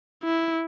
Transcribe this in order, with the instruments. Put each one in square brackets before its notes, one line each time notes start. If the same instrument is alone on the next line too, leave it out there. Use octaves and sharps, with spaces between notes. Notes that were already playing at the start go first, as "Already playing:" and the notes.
[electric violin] E4